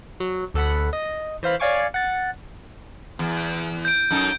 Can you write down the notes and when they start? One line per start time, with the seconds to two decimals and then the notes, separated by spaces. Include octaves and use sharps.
0.20 F#3
0.54 D2 A4 F#5 B5
0.93 D#5
1.43 E3 C5 F5 B5
1.60 C#5 D5 F5 G#5 C#6 D6
1.94 F#5 A6
3.19 E2
3.85 G6 D7
4.11 F#2 D#4 A4